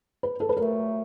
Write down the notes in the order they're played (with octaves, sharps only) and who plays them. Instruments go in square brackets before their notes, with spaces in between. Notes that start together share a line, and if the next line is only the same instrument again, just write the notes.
[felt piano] B4
A4
B4
[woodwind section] A#2 F#3 A3 [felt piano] A#4